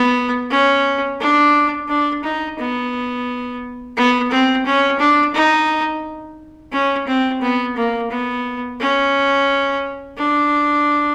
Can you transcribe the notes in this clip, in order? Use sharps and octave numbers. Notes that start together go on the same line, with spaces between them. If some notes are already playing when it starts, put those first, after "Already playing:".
Already playing: B3
C#4
D4
D4
D#4
B3
B3
C4
C#4
D4
D#4
C#4
C4
B3
A#3
B3
C#4
D4